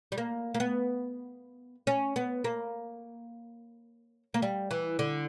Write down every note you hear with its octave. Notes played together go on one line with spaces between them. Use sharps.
G3
A#3
A#3
B3
C#4
B3
A#3
A#3
G3
E3
D3